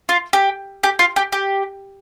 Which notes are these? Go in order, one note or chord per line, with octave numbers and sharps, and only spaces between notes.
F4
G4
G4
F4
G4
G4